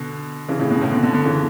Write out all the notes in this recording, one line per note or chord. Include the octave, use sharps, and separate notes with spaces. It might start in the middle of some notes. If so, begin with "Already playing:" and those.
Already playing: B2 D3
C#3 E3
A2 C#3
B2
A2 C#3
B2 D3
B2 D3
B2 D3
C#3 E3